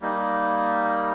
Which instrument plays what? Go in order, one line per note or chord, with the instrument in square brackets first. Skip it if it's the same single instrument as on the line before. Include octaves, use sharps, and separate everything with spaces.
[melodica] G3 A#3 D#4